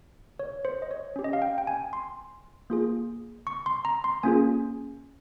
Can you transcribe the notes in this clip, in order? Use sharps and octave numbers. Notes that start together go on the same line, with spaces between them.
C#5
C5
D#5
C#5
C#4 G4
D#5
F5
G5
G5
G#5
C6
A#3 F4 G#4
C#6
C6
A#5
C6
A#3 C#4 F4 G#4 G#5